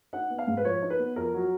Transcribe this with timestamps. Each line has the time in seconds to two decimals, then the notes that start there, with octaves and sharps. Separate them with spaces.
0.13 D#4 F#5
0.30 B3
0.38 F5
0.47 G#2
0.57 B4
0.64 F3 C#5
0.82 D#4
0.90 B4
0.99 B3
1.16 F2 A#4
1.33 F#3